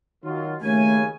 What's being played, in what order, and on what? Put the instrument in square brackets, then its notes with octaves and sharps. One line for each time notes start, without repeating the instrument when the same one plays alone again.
[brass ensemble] D#3 F#3 F4
[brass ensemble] D#2 C#3 G#5 [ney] A3